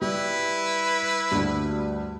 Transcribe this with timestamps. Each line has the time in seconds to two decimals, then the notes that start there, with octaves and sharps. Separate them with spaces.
0.02 G3 E4 B4
1.32 D2 G2